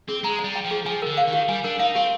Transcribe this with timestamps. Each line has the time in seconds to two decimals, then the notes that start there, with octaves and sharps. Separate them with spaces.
0.08 C4 G#4
0.23 G#3 A#5
0.39 D5
0.44 G3
0.55 G5
0.65 F3
0.71 G#4
0.86 F3 G#5
1.02 D3 A#4
1.17 F5
1.28 D#3
1.33 G4
1.48 G3 G#5
1.64 D4 A#4
1.79 D#4 F5
1.95 C4 G4